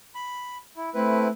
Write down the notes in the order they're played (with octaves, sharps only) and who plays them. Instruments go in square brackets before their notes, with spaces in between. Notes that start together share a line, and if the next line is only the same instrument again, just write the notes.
[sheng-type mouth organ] B5
E4
[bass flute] A3 [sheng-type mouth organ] C4 E4 B4